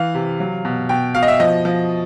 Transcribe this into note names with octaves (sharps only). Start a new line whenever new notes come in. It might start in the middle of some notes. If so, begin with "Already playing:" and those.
Already playing: E3 F5
C3
F#3
B2
B2 G5
B2 F5
D#5
E5
F3 D#5
F3